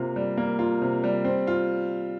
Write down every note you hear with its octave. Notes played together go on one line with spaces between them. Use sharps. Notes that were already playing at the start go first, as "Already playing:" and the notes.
Already playing: C3 A#3 F4
G3
A#3
F4
C3
G3
C4
F4